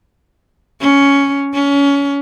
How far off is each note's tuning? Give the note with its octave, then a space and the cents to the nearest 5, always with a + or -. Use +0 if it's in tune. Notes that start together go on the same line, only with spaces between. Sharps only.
C#4 +10
C#4 +25